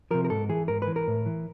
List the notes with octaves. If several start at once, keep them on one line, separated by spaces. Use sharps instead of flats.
C3 F3 A#4
A#4
G#2 A4
E3 G#4
G#2 A#4
B4
E3
A#4
A2
E3